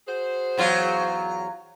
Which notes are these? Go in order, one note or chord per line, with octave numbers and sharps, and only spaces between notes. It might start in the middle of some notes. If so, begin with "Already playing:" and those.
F#4 G#4 C5
E2 F#3 F4